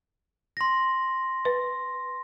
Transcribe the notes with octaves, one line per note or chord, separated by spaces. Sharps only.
C6 A#6
B4